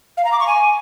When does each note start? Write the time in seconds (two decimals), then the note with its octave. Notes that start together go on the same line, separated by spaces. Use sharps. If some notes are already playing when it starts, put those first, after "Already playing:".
0.17 F5
0.25 A#5
0.32 D6
0.40 C#6
0.47 G#5